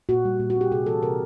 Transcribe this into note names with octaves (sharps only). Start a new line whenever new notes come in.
A#2 F#4
G3
A#2
F#4
C4
G4
C3 G#4
E3 A4
C3 A#4